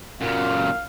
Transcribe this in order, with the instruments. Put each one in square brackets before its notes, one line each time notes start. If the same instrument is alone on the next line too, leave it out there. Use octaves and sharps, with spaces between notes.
[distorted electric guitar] F#2 A#2 [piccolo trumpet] F5